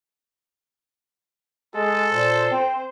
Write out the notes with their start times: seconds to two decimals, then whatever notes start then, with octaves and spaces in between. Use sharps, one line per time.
1.75 G#3 A4
2.12 A#2 C5
2.51 C4